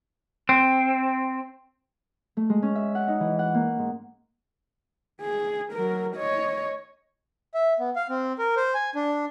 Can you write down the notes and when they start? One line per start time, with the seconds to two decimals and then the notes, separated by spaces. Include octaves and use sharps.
0.49 C4
2.37 A3
2.49 G#3
2.62 C#4
2.75 E5
2.95 F#5
3.08 D#4
3.20 E3
3.39 F#5
3.54 A#3
3.79 G#2
5.21 G#4
5.73 F#3 A#4
6.16 C#5 D#5
7.54 E5
7.80 B3
7.96 F5
8.09 C4
8.39 A#4
8.56 C5
8.74 G#5
8.95 D4